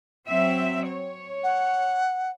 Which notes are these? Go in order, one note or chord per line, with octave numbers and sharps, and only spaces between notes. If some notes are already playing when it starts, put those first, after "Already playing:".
F#3 C4 E5
C#5
F#5